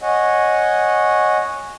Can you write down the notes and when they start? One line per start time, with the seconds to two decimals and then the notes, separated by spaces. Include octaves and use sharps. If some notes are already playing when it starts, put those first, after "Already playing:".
0.02 C#5 D#5 F#5 G#5